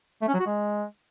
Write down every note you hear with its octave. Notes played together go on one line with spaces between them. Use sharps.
A3
C#4
F#3
F#4
G#3